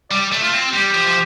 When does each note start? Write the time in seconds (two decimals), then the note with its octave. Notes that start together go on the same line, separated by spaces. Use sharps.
0.11 G3 D5
0.32 A3
0.42 A3 F4
0.53 C4
0.73 G3 G4
0.94 F3
1.07 F3